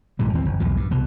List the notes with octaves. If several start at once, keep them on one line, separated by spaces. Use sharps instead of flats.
A#1 G#2 E3 G3
D#2 E3 C4
F#1
B1 E2 A2 F3
G2
C2 B2